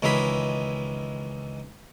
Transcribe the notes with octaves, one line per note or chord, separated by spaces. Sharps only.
C#2 D#3 E3 G#4 B5